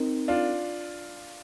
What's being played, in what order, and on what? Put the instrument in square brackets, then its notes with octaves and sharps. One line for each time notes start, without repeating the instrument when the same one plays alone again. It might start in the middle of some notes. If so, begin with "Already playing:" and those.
Already playing: [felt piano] C4 D#4 A#4
[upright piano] D4 F4